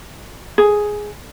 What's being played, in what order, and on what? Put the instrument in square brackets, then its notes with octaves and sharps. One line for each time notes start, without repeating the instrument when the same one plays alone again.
[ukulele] G#4